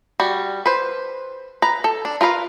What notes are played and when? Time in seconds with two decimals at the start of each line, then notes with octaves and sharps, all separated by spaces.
0.20 G3 F#4
0.66 B4 C5
1.62 B4 A#5
1.84 A4
2.05 D4
2.21 F4 A#4 B4 F5